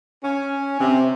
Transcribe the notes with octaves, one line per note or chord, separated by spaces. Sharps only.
C#4
C3